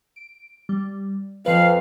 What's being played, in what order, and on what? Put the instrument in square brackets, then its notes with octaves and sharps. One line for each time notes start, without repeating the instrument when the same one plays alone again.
[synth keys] D7
G3
[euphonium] F2 [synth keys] F3 B4 [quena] F5